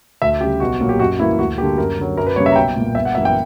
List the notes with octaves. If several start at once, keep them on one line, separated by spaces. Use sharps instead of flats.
D2 E5
C#3 G3 G4
B1 F#4
A#2 F#3 A#3
G4
F#2 F#4
E3 G3 A#3 E4
D2 F#4
D3 G3 A#3 G4
F#2 A#4
D3 F#3
F#2 A#4
B4
C#3 G3 A#3 C#5
E5
A#5
B1 G5
A#2 A#3
G1 E5
F#5
F#2 E3 A#3 E5
G5